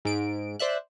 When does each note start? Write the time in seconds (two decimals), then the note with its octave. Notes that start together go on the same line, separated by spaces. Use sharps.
0.05 G#2 D7
0.59 C5 D5 E5 F#6